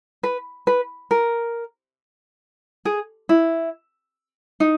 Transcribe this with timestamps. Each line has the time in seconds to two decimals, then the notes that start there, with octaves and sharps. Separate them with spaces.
0.23 B4
0.67 B4
1.11 A#4
2.85 G#4
3.29 E4
4.60 D#4